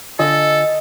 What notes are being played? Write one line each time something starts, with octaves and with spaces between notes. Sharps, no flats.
D3 F4 A4 D#5 G#5